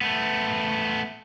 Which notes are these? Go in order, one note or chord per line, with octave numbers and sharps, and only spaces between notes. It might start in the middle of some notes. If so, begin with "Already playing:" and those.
A3 B3